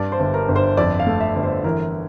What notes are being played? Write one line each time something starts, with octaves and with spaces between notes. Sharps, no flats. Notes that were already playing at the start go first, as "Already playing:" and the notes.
Already playing: G2 D5
C5
G1
A#4
G1
C5
F2 D5
F5
A3
E5
G1
C5
E3 A#4